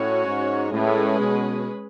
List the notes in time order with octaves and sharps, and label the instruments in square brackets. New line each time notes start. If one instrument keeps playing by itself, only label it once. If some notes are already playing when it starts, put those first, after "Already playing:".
Already playing: [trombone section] A2 [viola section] C#4 F#4 C#5
[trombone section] G#2
[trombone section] A2 [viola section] G#3 C#4 G#4 B4
[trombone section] B2